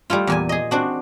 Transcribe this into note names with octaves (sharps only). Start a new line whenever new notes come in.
G3 A3 E4 F4
E2 A#2 G#5
G#4 D#5
C4 D4 F#4